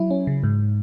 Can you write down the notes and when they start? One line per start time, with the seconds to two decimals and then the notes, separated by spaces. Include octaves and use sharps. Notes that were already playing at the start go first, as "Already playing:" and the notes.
Already playing: F#3 E4
0.10 C#4
0.27 C#3
0.43 G#2